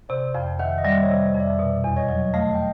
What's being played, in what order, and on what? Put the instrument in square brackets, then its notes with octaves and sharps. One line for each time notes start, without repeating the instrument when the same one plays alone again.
[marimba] C3 [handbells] C5 D5
[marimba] F2 [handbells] F5 G5
[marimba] D#3 [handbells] E5 F#5
[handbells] D#5
[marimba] G3 [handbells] D5 E5
[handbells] C#5 D#5
[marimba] C3
F2
[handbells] D5 E5
[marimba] B2
E2
[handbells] C#5 D#5
[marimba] F#3
[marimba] A3 [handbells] D#5 F5
[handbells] G5